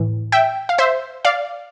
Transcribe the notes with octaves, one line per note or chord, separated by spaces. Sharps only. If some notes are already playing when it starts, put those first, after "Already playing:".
Already playing: A2 E3
E5 G5
F5
C5 E5
D5 F5